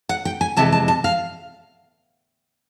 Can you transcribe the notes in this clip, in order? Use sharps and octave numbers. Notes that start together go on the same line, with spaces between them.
F#5
G5
G#5
F2 C3 E3 G#3 A5
A5
A5
F5